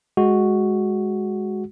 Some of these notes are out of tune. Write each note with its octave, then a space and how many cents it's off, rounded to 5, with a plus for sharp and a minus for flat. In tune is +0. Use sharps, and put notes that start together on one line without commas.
G#3 +0 F#4 +0